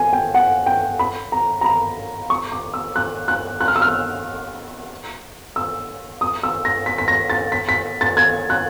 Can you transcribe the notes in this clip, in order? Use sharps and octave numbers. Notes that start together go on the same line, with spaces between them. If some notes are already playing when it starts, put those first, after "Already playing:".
Already playing: G#5
G5
F#5
G5
B5
A#5
A#5
B5
C#6
D6
E6
F#6
F#6
F#6
F6
E6
F6
E6
D#6
E6
A#6
B6
B6
A#6
A6
B6
B6
A6
G#6
F#6